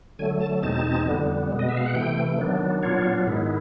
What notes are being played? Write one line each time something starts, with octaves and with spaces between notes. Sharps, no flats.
D3 F#3 A3 G#5
A5
E2 B2 G#3 C4 D#4 A5
F2 D3 G3 B3
B2 G#3 B3
D#5
E5
F5
F#5
C3 E3 A3 G5
D#3 F#3 B3 D4
A#2 F#3 B3 D4 F4 C#5
G#2 D#3 G#3 B3 E4